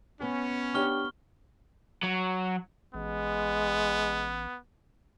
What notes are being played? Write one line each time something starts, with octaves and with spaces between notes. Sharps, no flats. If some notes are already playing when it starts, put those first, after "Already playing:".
B3 C#4
D4 G4 C#5 C#6 F6 G7
F#3
A1 G#3 B3